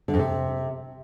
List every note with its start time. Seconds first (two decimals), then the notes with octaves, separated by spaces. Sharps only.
0.08 D3
0.14 F2
0.19 C3